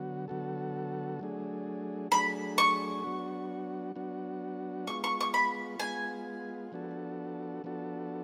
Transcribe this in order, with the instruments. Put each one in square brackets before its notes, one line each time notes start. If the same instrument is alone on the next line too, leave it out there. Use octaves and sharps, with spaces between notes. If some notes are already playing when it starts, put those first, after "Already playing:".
Already playing: [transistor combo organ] D3 F#3 B3 F#4
D3 F#3 B3 F#4 A4
F#3 A3 D4 G#4
[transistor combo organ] F#3 A3 D4 G#4 [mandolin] B5
[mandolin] C#6
[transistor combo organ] F#3 B3 D4 F#4
F#3 B3 D4 F#4
[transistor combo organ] G#3 B3 F4 [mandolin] C#6
[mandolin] C#6
C#6
B5
[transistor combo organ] G#3 B3 F4 [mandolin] G#5
[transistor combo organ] F3 B3 D4 F#4 A4
F3 B3 D4 F#4 A4